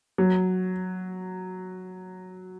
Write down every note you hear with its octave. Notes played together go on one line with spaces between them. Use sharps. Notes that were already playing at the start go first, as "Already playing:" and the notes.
F#3